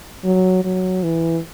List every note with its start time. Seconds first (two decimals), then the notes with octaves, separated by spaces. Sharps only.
0.24 F#3
0.64 F#3
1.03 E3